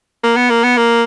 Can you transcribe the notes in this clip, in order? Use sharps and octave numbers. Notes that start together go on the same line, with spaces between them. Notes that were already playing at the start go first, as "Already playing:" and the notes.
A#3
B3
A#3
B3
A#3